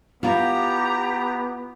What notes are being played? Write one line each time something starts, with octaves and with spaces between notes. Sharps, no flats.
B3 E4 F4 G4 A#5